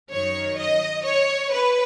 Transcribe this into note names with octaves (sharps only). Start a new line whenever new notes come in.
F#2 D#3 C#5
D#5
C#5
B4